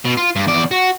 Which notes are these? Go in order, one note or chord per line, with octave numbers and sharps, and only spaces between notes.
B2
F4
G2
E2 D5
F#4